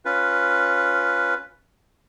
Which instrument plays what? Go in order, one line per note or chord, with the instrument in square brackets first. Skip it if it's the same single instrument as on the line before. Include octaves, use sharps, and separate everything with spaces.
[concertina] C#4 F4 B4